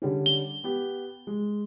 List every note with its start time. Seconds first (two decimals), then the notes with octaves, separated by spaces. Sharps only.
0.02 D3 G3 C#4
0.26 G7
0.64 B3 G4
1.27 G#3